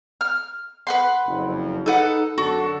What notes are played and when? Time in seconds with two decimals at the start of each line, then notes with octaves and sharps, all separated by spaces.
0.21 F6
0.87 B4 F#5 C6
1.27 F#1 F2
1.86 D#4 A4 B4 F#5
2.38 F#2 D3 F#4 A4